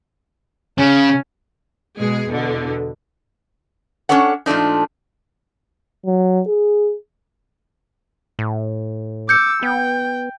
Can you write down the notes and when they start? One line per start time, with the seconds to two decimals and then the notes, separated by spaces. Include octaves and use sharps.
0.78 C#3 C#4
1.98 B2 G#3 G#4
2.28 E2 B2 D3
4.09 C#4 D4 A4 C#5 F#5
4.46 A#2 F3 A3 D4 D#4
6.06 F#3
6.47 G#4
8.39 A2
9.29 D6 E6 G6 C#7
9.63 B3 G5